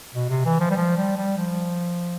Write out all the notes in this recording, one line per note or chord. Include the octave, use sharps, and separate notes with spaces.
B2
C3
E3
F3
G3
F3
G3
G3
F3